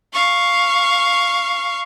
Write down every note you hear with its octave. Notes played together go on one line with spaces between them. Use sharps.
F5 C#6